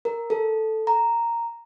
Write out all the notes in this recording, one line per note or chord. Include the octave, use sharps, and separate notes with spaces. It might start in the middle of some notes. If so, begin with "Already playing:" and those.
A#4
A4
A#5